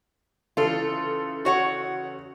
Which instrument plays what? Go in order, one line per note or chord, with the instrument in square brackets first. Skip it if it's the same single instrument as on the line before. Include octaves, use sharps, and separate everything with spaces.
[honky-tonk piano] C#3 E3 A4 [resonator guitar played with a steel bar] F4
[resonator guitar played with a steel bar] F#4 C#5 F#5